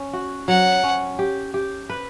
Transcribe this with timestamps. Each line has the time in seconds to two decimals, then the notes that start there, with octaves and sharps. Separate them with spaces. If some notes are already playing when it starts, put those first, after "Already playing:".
Already playing: C#4
0.13 F#4
0.48 F#3 F#5
0.83 C#4
1.19 G4
1.54 G4
1.90 B4